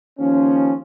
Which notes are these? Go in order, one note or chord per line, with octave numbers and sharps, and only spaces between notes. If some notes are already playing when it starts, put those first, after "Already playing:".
D#2 F3 C#4